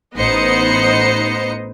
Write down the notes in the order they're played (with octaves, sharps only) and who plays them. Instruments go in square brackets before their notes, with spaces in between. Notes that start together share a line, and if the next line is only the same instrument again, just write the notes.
[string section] A1 B3 D#4 C5 D#5 C#7